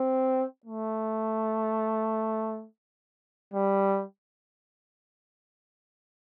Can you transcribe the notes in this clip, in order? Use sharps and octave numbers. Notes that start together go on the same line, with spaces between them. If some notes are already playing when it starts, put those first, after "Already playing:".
Already playing: C4
A3
G3